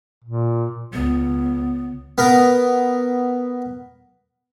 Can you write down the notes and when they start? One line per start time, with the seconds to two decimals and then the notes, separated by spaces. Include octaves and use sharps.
0.24 A#2
0.93 C#2 B3
2.18 B3 A#4